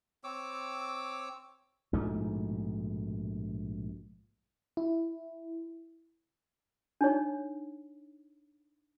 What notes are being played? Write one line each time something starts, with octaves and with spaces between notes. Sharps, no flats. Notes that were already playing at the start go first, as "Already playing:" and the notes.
C4 C#5 D6 E6
A#1 G#2 B2 A3
E4
D4 D#4 C#5